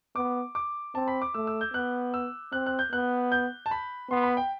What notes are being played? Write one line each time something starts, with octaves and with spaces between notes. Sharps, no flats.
B3 D6
D6
C4 A5
B5
D6
A3 E6
E6
G6
B3 F#6
E6
C4 F#6
F#6
G6
B3 F#6
G6
A5
B5
B3 C6
B5
G5